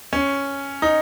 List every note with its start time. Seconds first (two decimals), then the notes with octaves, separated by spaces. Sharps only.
0.13 C#4
0.82 D#4